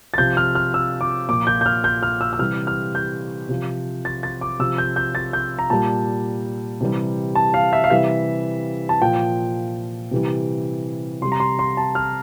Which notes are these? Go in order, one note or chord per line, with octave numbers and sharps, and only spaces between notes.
A6
C3 F3 G6
F6
F6
E6
D6
A#2 F3 D6
G6
G6
F6
G6
F6
E6
E6
C3 E3 G3 F6
F6
G6
C3 F3
A6
A6
D6
C3 F3 E6
G6
G6
A6
G6
A#5
A#2 G3 A5
C3 E3 G3
A5
F5
E5
F5
C3 E3 G3 E5
A5
A#2 F3 G5
C3 E3 G3
C3 G3 C6
A#5
C6
C6
A5
F6